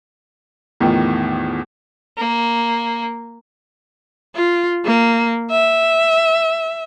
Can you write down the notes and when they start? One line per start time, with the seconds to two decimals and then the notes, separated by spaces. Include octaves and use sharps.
0.80 E2 A2 D#3 F3
2.18 A#3
4.35 F4
4.85 A#3
5.51 E5